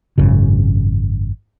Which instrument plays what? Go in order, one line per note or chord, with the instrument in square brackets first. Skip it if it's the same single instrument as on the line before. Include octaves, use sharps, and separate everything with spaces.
[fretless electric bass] G#1 F#2 C#3